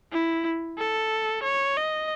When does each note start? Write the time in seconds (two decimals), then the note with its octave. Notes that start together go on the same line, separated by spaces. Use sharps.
0.12 E4
0.78 A4
1.43 C#5
1.76 D#5